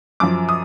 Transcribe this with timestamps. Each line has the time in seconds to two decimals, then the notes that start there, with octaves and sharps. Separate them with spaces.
0.20 F#2 F3 D6
0.49 D#6